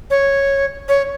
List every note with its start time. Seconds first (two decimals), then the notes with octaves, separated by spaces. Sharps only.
0.10 C#5
0.88 C#5